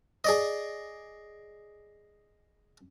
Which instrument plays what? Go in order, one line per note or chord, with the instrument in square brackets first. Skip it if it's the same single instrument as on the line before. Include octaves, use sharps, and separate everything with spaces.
[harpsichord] G#4 D5 D#5